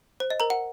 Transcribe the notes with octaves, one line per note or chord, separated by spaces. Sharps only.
C5
D#5
A#4 A#5
F#5